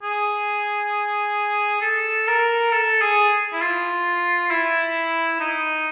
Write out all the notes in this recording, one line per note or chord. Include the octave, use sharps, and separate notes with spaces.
G#4
A4
A#4
A4
G#4
E4
F4
E4
D#4